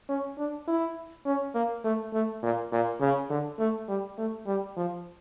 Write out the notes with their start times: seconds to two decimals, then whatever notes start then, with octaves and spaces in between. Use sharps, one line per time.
0.09 C#4
0.38 D4
0.68 E4
1.25 C#4
1.55 A#3
1.84 A3
2.13 A3
2.42 A#2
2.72 A#2
3.00 C#3
3.30 D3
3.59 A3
3.88 G3
4.18 A3
4.47 G3
4.77 F3